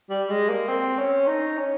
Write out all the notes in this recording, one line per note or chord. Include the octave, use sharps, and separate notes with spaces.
G3
G#3
A#3
C4
C#4
D#4
C#4